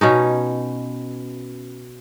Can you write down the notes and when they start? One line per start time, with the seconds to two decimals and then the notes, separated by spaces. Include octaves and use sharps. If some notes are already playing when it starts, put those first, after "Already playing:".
0.01 B2 C#4 D#4